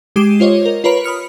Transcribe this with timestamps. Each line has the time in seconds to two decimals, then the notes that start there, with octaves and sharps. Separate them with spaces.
0.16 G#3 G4 D6 C7 D#7 E7
0.40 F4 C5 C#5 D#5
0.66 A#4
0.84 F4 B4 C#5 A#5 B5 D7
1.04 B5 D#6 F6 C#7